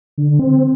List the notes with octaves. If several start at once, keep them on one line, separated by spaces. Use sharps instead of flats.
D3
C4